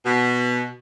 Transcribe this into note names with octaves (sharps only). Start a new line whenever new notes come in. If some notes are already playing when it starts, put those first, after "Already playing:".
B2